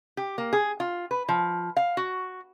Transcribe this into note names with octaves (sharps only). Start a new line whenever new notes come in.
G4
A#3
G#4
F4
B4
F3
F5
F#4